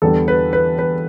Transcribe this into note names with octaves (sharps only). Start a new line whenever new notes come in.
E2 D3 G3 B3 D4 A4
B4
B4
B4